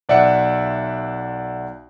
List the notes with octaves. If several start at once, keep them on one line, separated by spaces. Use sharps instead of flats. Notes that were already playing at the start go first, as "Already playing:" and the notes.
B1 D5 E5 F#5 C#7